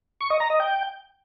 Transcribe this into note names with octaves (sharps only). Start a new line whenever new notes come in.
C#6
D#5
A#5
D#5
G5